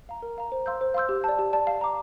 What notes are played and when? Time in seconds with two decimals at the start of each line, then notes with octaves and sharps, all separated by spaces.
0.09 F5 A#5
0.22 A#4
0.38 F5 A#5
0.52 C5
0.66 F5 C6 E6 G6
0.81 C5
0.94 F5 C6 E6 G6
1.09 G4
1.24 D5 A5
1.39 G4
1.53 D5 A5
1.67 F5
1.81 A#5 D6